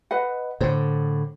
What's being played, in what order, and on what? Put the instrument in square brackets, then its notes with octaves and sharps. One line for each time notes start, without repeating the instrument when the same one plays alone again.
[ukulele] B4 D#5 F#5
[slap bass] A2 D3 [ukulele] C5